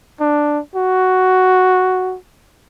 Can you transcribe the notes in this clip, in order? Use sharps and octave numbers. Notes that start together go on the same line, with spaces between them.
D4
F#4